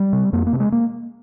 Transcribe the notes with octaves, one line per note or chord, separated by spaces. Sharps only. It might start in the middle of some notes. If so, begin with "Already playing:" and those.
Already playing: G3
C3
F2 A#3
A#3
C3
G#3
A#3